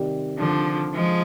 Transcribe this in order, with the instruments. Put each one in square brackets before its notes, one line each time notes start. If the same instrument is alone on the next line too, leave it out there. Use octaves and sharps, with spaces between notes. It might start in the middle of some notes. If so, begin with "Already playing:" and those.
Already playing: [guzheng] C3 D#3 G3 C4
[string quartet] D3 F3
F3 G#3